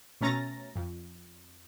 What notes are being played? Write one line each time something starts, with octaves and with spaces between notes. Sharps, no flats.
B2 A3 C#4 A#5 A6 A#6
F2